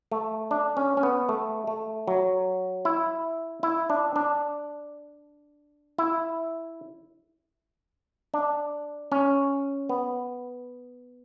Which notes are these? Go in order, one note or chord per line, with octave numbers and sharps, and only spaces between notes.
A3
D4
C#4
C#4
B3
A3
A3
F#3
E4
E4
D4
D4
E4
D4
C#4
B3